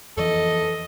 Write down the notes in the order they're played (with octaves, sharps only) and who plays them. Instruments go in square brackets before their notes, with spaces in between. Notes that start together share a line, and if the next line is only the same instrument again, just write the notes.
[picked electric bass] F2 E3 F3 [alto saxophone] A4 [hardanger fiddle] D#5